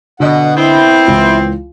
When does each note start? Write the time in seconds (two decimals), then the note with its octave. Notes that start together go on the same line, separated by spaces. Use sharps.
0.20 B2 D3 D#5 F#5
0.56 B3 C4 E4
1.07 C#2 E3